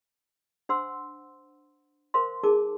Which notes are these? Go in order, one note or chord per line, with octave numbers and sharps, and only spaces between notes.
D4 C5 F#5 C6 E6
A#4 C5 F5 C6
D#4 G#4 A#4 A5 D6